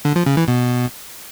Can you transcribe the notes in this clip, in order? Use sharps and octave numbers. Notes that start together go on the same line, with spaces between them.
D3
F3
C#3
E3
B2